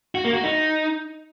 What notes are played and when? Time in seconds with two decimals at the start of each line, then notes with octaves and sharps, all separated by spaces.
0.15 F#4
0.24 A#3
0.34 F#4
0.43 D#4